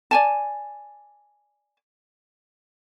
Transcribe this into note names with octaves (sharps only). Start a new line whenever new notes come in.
D5 G#5 A5